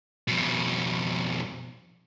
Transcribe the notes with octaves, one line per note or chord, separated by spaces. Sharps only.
F2 B2